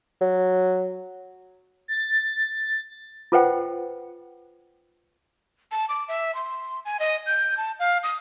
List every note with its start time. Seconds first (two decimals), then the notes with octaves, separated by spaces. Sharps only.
0.21 F#3
1.88 A6
3.32 F4 A4 B4 C5 F#5 G5
5.71 A5
5.89 D6
6.08 E5
6.35 C6
6.85 G#5
7.00 D#5
7.27 G6
7.57 A5
7.80 F5
8.03 D#6